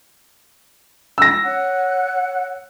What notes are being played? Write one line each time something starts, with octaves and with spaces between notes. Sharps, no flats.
E6 A#6
C#5 F#5 F#6